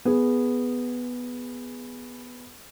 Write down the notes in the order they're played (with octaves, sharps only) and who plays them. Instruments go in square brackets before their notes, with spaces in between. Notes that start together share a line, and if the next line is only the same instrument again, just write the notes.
[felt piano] B3 G#4